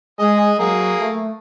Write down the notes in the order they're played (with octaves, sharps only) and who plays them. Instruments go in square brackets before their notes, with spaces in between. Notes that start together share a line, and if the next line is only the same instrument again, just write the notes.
[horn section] G#3 G#5 [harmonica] G#4 D#5
[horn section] F#3 [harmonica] A#3 G#4
[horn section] A3